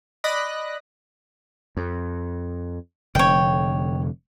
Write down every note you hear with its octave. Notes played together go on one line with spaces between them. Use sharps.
D5 D#5 B5 D#6 F#6 A#6
F2
F1 D3 C#5 G5